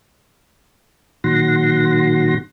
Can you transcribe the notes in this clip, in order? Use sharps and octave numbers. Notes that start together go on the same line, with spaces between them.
A#2 D#3 F#3 F#5 C6 A#6